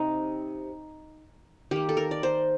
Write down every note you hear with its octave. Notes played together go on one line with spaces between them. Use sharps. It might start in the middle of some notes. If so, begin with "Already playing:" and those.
Already playing: C3 C4 D#4
D#3 A#3 G4
A4
A#4
D5
C5